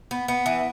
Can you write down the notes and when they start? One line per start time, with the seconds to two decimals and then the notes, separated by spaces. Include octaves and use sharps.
0.11 B3
0.28 B3
0.46 E3